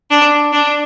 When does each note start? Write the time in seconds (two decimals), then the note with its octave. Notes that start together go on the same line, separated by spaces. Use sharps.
0.10 D4
0.53 D4